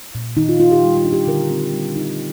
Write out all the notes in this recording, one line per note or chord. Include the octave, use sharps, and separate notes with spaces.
A#2
D#3 D#4
F4
A#3 F4
G4
G3
F4
D4
G4
D3 A#4
C4
G3
D#4